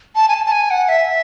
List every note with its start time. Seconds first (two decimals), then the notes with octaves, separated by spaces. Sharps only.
0.15 A5
0.28 G#5
0.34 A5
0.46 A5
0.52 G#5
0.71 F#5
0.89 E5